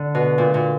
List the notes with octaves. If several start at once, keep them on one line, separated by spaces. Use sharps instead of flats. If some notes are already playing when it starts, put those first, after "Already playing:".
Already playing: D3
B2
A#2
A#2